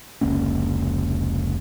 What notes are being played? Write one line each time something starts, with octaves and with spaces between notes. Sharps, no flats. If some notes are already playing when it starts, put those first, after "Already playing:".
F1 C#2 A#3 C#4